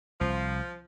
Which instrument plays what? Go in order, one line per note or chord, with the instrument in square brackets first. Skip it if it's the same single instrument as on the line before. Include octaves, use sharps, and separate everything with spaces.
[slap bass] C2 [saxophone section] F3